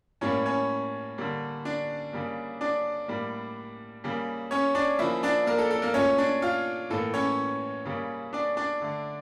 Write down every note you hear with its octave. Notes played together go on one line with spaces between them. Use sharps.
A2 G3 A#3 C#4 C#5
C#4 C#5
D3 G3 A#3
D4 D5
C#3 G3 A#3
D4 D5
A2 G3 A#3
C#3 G3 A#3
C#4 C#5
D4 D5
C#3 F3 A#3 E4 E5
D4 D5
A#3 A#4
A4
A4
A#3 A#4
A#2 A3 C#4 C#5
D4 D5
F4 F5
A2 E3 A#3 A4
C#4 C#5
C#3 G3 A#3
D4 D5
D4 D5
D3 A3